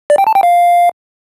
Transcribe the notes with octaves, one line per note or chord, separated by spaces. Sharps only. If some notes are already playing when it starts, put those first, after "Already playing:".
D5
G5
A5
G5
F5